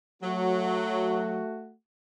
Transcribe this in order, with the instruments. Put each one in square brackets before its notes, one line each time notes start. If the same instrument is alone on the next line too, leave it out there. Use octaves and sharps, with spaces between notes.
[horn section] F#3 [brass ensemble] A3 F#4